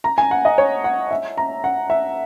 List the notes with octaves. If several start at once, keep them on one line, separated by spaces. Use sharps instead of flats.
A#5
G#5
F#5
D#5
C#5
F#5
E5
A#5
F#5
E5